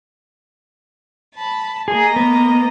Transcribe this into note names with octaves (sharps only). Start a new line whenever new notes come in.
A5 B5
A#3 G#4 D#5 A#5
B3